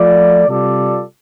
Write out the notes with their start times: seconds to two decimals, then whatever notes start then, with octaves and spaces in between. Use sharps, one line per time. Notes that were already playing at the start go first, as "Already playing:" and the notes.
Already playing: F3 A3 F4 D5
0.46 C3 G3 F4 A4 D5